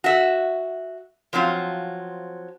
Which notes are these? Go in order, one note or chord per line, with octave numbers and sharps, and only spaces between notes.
F#4 E5
F3 F#3 C4 F4